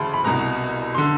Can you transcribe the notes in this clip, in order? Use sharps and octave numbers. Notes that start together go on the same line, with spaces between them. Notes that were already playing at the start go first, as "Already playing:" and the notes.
Already playing: D2 C#3 E3 A5 B5 C6
B5
C2 B2 A#5
D3 C6